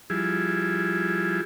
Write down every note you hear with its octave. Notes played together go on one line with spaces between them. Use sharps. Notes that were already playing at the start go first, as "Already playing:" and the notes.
F3 G3 E4 G#4